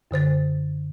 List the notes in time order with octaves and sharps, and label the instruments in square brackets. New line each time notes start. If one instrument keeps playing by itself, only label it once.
[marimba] F#2 D3 C5 A6